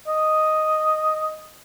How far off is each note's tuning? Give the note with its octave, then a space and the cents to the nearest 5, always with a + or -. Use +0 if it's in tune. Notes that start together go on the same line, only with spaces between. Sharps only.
D#5 +0